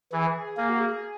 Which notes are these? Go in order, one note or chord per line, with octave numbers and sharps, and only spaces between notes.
E3 G#4
A#3 G#4
F#4
G#4